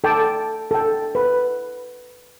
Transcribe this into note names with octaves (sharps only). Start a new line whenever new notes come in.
A4 G5 A5 D6
A4 G5
B4